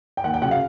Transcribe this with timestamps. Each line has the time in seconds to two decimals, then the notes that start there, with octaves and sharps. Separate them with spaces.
0.17 G5
0.24 D#2 F#5
0.34 G5
0.42 C#3 F#3 F#5
0.51 F5